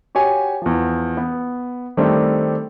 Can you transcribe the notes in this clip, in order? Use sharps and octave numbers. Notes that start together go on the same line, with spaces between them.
F#4 G4 C#5 G#5
E2 F3
B3
D#3 G3 A3 C4 D4